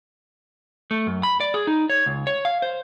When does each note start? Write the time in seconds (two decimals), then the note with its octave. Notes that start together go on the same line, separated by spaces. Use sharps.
0.91 A3
1.07 F#2
1.23 B5
1.40 D5
1.54 G#4
1.67 D#4
1.90 C#5
2.06 C#2
2.27 C#5
2.45 F5
2.62 C5